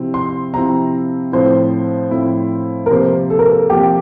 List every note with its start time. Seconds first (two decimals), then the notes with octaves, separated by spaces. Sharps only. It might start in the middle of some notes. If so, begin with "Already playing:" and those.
Already playing: C3 F3 C4 E4
0.14 C6
0.53 C3 F3 C4 E4 A#5
1.32 A2 F3 C4 E4 C5
2.11 A2 F3 C4 E4
2.86 A#4
2.91 C3 F3 A#3 C5
3.30 A4
3.39 A#4
3.48 A4
3.70 C3 F3 A#3 G4